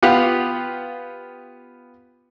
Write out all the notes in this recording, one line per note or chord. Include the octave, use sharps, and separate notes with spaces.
B3 F4 G4 F5 F#5